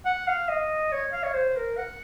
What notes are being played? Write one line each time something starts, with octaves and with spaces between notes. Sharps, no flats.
F#5
F5
D#5
C#5
F5
C#5
C5
A#4
F#5